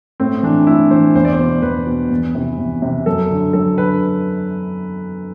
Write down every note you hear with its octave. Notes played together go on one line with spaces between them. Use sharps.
A2 C4
E3 D4
A2 E4
E3 C5
E2 C5
D5
C5
B2
E2 B4
B2
E2
C3 E3
E2
C3 E3
F#2 A4
D3
F#2 A4
D3 B4